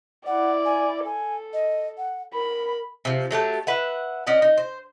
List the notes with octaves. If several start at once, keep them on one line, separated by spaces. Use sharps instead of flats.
E4 D5 F#5
G#5
A4 G#5
D#5
F#5
A#4 B5
C3 F3
F#3 A3 G4 A5
B4 E5 F#5
C#4 D5 D#5 F#5
D#4
C5